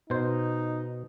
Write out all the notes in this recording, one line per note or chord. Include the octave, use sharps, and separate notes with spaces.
B2 D#4 C5